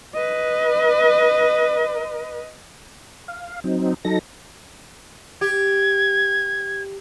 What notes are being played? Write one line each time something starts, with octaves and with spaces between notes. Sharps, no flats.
B4 D#5
F5
F#3 C4 D#4
F#3 D#4 A4 A#6
G4 G#6